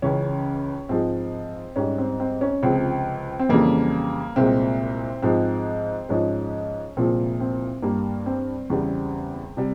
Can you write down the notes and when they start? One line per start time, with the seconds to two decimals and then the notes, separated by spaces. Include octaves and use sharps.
0.02 C#2 C#3 E3 C#4
0.89 G#2 F3 G#3 C4
1.76 G#2 G3 C#4
1.98 C4
2.20 C4
2.41 C#4
2.63 C#2 C3 F3 G#3 C4
3.39 C4
3.49 F2 C#3 E3 G3 A#3
4.36 C2 A#2 G#3 C4
5.22 G#2 F3 G#3 C4
6.09 G#2 F3 G#3 C#4
6.97 C2 A#2 F3 G#3 C4
7.40 C4
7.82 G2 G3 A#3
8.26 C4
8.70 E2 C#3 G3
9.57 C3 G3